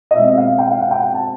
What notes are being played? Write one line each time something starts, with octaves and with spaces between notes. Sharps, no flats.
D#5
B2 G#3 C4 E5
E5
F5
G5
F5
F#5
G5
F#5
A5